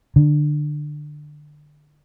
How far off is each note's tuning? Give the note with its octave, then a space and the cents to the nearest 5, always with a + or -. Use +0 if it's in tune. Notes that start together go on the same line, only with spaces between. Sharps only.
D3 +20